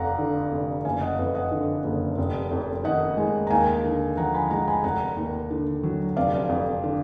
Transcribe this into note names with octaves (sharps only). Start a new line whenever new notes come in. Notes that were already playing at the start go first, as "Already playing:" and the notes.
Already playing: F1 F2 D5 F5 F#5 A#5
D3
F1
F#1 F5 G#5
D#5 F#5
F2 B4 D#5
D#5 F#5
D3
F#1
F1
F2
D#3 D#5 F#5
G#3
A#5
D#2 F5 G#5
D3
F3 F#5 A#5
G#5 B5
G#3 F#5 A#5
G#5 B5
F1 F#5 A#5
D#2
D3
F#3
F1 D5 F5
F2
D3